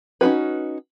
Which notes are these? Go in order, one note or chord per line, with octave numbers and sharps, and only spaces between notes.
C#4 D#4 F4 F#4 B4